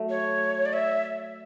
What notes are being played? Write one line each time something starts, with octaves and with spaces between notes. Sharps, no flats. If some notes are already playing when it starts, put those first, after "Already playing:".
Already playing: F#3 A3
C#5
D5
E5